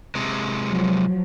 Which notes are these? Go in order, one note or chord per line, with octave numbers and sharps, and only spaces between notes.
C3 G#3
F3 F#3